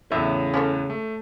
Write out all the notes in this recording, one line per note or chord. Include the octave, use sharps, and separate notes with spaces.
E2 A2 C#3 E5
C#4 A4 C#5
A3